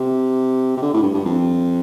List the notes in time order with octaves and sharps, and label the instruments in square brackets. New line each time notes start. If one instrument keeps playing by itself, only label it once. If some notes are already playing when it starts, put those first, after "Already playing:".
Already playing: [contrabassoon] C3
C3
D3
A2
G2
G2
F2